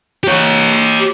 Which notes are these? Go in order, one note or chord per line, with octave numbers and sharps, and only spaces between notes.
G4 C#5